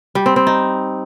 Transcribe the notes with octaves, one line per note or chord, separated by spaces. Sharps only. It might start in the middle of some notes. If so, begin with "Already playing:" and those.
G3
C4
C4
D#4